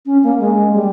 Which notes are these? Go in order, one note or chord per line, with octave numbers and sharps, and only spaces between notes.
C#4
A#3
G#3
G3